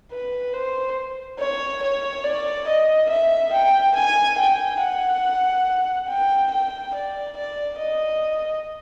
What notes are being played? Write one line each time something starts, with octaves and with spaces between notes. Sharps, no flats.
B4
C5
C#5
C#5
D5
D#5
E5
G5
G#5
G5
F#5
G5
G5
D5
D5
D#5